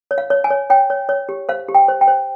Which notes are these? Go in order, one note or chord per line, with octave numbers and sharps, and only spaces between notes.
C#5
F5
C#5
G#5
C#5
C#5 G5
C#5
C#5
G4
C5 F5
G4
G5
C5
G5
C5